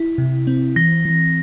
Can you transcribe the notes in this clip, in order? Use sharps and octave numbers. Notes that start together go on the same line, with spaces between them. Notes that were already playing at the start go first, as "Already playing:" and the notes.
Already playing: E4
C3
C4
E3 A#6
E3